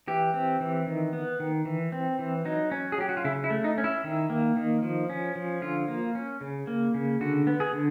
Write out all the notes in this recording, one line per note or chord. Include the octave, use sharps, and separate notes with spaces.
E3 G4
C4
E3
D#3
B3
D#3
E3
C4
E3
F#3 D#4
C#4
G#4
F#3 G4
F#4
F4
C#3 E4
E4
A3
D#4
C#4
E4
D#3
A#3
D#3
F3
C#4
F3
D3 F4
A#3
C#4
C#3
A#3
C#3
D3 F#4
B3
G#4
D3